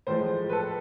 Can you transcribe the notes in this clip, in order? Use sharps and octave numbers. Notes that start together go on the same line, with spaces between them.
A2 F3 G#3 C5
B4
A4